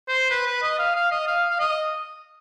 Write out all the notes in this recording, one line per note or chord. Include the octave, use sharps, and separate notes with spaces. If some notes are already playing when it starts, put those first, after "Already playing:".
C5
B4
B4
D#5
F5
F5
D#5
F5
F5
D#5